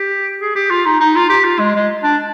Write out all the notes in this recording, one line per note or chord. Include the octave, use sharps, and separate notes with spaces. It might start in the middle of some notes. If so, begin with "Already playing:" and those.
Already playing: G4
G#4
G4
F4
D#4
D#4
F4
G4
F4
G#3
G#3
D4